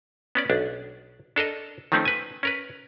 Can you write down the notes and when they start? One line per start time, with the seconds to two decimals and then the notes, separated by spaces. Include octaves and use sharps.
0.35 B3 C#4 D5
0.50 B1 D4
1.36 D4 A4 A#4 D#5
1.92 D#3 F3 A3 C4 C#4 D#4
2.05 B4 G#5
2.43 C#4 A#4 B4